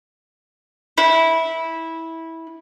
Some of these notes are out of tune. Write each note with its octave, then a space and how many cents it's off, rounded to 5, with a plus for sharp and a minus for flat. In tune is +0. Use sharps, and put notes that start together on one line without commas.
E4 -15